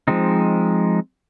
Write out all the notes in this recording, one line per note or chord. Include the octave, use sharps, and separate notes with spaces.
F3 G#3 C4 D#4